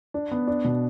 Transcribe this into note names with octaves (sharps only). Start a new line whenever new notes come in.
D4
B3
D4
B2